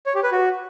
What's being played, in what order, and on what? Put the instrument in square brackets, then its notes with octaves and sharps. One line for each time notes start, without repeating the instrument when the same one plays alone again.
[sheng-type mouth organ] C#5
G4
B4
F#4